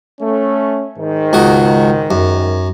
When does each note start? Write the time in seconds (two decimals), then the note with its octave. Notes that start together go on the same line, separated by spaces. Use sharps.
0.21 A3 C#4
0.96 G#2 D#3
1.33 C#2 F#4 D#5
2.11 F#2